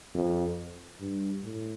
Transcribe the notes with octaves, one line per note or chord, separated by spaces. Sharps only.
F2
G2
A2